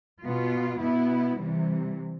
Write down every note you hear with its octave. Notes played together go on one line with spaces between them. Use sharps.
B2 B3 F4
B2 B3 E4
C3 E3 G3